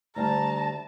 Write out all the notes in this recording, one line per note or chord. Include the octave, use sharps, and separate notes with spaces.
D2 G3 A5 A#5